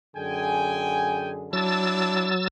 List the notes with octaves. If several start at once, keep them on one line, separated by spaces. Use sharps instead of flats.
F#2 D3 G#4 G5 G#5
F#3 D4 E4 A5 E6 A6